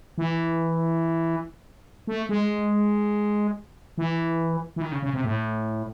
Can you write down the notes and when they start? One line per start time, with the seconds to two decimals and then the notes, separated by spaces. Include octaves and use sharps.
0.18 E3
2.07 A3
2.29 G#3
3.98 E3
4.76 E3
4.82 D#3
4.92 C#3
5.02 C#3
5.13 C3
5.24 A2